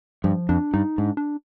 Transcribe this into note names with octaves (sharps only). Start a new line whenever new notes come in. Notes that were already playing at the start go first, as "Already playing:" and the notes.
G2 F3
F2 D4
G2 D#4
G#2 D4
D4